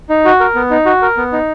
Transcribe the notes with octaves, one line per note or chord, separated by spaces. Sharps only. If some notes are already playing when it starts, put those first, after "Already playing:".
D#4
F#4
A#4
B3
D#4
F#4
A#4
B3
D#4